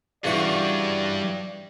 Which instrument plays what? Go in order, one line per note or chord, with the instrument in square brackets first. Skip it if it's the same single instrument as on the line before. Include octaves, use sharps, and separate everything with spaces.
[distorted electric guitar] G2 [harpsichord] C#3 E3 F#4 [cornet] D5